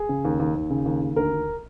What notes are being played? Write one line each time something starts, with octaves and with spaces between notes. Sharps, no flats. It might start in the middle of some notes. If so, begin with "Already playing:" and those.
Already playing: G#4
C#3
D#2
D#2
D#2
C#3
D#2
D#2
D2 A#4
D2